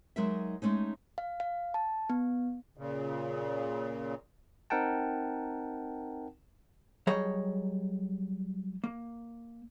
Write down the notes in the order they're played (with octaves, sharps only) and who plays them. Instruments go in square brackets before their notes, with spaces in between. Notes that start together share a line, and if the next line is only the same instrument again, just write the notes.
[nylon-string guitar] F#3 G#3 D#4 A#4 D#5 E5
G#3 A3 C#4 D#4
[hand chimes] F5
F5
A5
B3
[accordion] A#2 C#3
[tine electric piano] C4 D#4 A#4 F#5 G5 A5
[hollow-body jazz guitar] F#3 G3 G#4 C#5 D#5
A#3